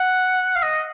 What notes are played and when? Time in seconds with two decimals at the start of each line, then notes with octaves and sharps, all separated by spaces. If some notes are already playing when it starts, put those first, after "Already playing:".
Already playing: F#5
0.56 F5
0.63 D#5